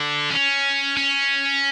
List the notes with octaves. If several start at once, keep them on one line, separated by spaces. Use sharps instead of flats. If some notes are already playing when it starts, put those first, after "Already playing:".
Already playing: D3
C#4
C#4